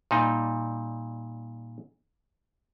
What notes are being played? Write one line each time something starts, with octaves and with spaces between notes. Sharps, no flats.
A#2 G3 D#4